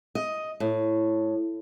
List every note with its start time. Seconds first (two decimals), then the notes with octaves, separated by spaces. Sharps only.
0.15 D#5
0.60 A2